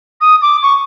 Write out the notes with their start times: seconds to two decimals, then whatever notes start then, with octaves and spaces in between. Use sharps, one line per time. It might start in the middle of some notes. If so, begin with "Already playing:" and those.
0.21 D#6
0.42 D6
0.63 C#6